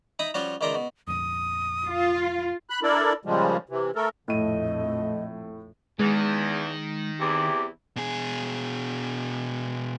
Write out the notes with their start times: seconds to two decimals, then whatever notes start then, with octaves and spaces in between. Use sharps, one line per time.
0.19 D#4 E4 A#5 B5 D#6
0.34 F3 G3 C#4 F4 F#4 C#5
0.61 C#2 D#3 E4 D5 A#5 C6
0.75 B2
1.08 F1 A#1 F2 D#6
1.85 F4
2.70 B5 F#6
2.83 D4 E4 A4 A#4 D5
3.25 A#2 C#3 F3 G3 G#3
3.69 C3 E3
3.95 A3 A4 A#4
4.28 A#1 F2 A2 A3 D#5 D#7
5.99 E2 D#3 G#3
7.20 E2 C3 E4 G4
7.96 B2 G#4